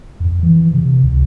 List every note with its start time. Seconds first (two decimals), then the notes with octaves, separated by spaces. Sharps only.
0.20 F2
0.43 E3
0.73 C3
1.04 C#2